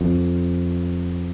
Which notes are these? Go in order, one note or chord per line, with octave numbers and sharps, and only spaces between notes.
F2